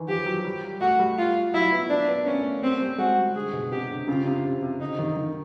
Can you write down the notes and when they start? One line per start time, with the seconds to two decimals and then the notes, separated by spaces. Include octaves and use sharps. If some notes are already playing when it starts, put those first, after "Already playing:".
Already playing: D#3 E3
0.08 F3 G4
0.26 F#3
0.44 G3
0.81 A3 F#4
0.99 G3
1.18 F4
1.54 F#3 E4
1.72 B3
1.89 A#3 D4
2.08 B3
2.26 A#3 C#4
2.38 A3
2.62 G3 C4
2.81 G3
2.98 G#3 F#4
3.16 G3
3.35 D3 G#4
3.53 B2
3.72 C3 G4
3.90 D3
4.08 C#3 F4
4.25 C3
4.45 C3
4.63 C3
4.80 D3 D#4
4.99 D#3
5.17 D#3